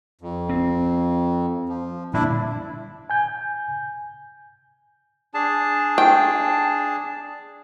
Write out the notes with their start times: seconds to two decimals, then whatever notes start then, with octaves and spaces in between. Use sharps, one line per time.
0.21 F2
0.49 C4
1.69 F3
2.14 A#2 D3 G3 D4 E4
3.10 G#5 G6
5.34 D4 G#4 A5
5.98 G5